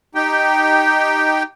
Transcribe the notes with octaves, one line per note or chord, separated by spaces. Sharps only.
D#4 G4 G5